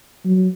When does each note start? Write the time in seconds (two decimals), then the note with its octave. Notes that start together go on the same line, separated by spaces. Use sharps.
0.24 F#3